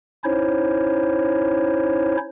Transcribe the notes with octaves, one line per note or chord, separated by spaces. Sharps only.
C#4 D#4 E4 C5 C#5